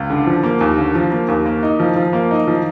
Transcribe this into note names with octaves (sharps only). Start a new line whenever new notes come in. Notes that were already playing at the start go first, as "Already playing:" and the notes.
Already playing: C#2
D3
F3
A#3
D#2
D3
F3
A#3
D#2
A#3
D#4
F3
F3
A#3
D#4
F3